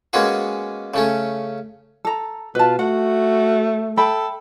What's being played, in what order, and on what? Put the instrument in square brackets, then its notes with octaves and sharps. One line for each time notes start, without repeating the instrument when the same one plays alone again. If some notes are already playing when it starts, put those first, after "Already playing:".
[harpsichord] G#3 A#3 B3 C#4 F#4 G#4
C#3 A3 C#4
[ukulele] A4 A#5
[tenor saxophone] B2 [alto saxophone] F4 [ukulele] B4 A5
[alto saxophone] A3 [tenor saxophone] F#4 [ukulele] F#5
[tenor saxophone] A4 [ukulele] E5 G5 B5